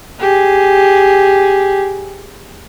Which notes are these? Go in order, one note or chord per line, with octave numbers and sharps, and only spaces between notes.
G4 G#4